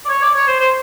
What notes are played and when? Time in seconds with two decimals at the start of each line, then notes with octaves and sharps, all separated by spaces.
0.05 D5
0.09 C#5
0.22 D5
0.34 C#5
0.47 C5
0.60 C5